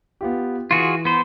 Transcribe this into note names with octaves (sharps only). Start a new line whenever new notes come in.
B3 F4 G4
E3 F4 F#4 G#4
B3 C5